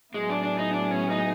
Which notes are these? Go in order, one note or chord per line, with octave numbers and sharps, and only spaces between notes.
A2 F#3 G#3 B3 E4 G#4
D4
D4
D#4
D4
C#4
D#4